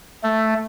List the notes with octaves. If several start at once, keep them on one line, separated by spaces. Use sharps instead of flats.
A3